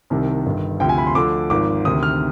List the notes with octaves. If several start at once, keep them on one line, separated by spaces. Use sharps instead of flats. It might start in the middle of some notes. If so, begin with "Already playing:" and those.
C2 C3 D#3
G1 G2 D#3
D2 C3 F3 G5
G#5
B5
C6
D2 D3 F3 D6
G#1 G#2 F3 D6
D2 C3 D#3 D#6
F6